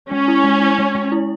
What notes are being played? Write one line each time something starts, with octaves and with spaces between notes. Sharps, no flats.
G#3 C#4
E4
G#3
E4
G#3
G#3
E4